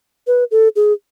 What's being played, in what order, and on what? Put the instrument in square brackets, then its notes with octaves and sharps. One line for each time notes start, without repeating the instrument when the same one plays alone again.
[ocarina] B4
A4
G#4